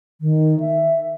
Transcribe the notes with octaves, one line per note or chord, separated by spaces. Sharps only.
D#3
E5